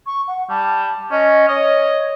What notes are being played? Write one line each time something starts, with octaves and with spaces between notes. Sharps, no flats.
C#6
F#5
G3 A5
C#4 D#5
C#5 D#5